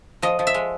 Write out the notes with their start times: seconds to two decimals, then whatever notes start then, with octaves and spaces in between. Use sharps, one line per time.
0.22 F3 D#5
0.39 F3
0.47 E5
0.54 G#3